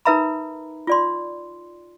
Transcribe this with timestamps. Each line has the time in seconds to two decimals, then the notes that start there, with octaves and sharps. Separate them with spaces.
0.05 D#4 A#4 B4 E5 A#5 B5
0.87 F4 D5 C6